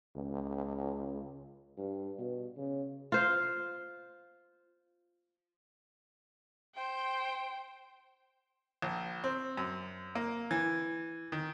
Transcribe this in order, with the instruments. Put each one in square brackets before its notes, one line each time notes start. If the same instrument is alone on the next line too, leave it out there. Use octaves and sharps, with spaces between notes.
[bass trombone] C#2
[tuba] G2
B2
C#3
[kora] F4 C5
[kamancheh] C5 G5
[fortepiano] A#1
C4
F#2
A#3
E3
D#3